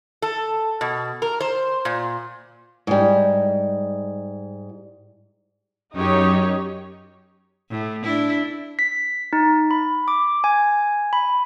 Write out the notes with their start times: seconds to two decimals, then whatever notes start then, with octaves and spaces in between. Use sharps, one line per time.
0.22 A4
0.81 B2
1.22 A#4
1.41 C5
1.85 A#2
2.87 G#2 G3
5.93 F#2 D#4 G4 C#5
7.70 A2
8.03 D4 E4
8.79 B6
9.33 D#4
9.71 B5
10.08 D6
10.44 G#5
11.13 B5